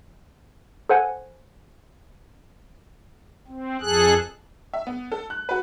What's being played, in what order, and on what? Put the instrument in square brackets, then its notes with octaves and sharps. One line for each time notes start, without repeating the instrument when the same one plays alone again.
[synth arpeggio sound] A4 C5 F#5 G#5
[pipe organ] C4
F2 G#4 A4 F#6
[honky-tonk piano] E5
B3
A4
F#6
F#4 B4